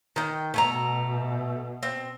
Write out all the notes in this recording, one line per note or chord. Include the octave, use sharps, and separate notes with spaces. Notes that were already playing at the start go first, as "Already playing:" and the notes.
D#3 G5
B2 A3 G#5 A#5
C4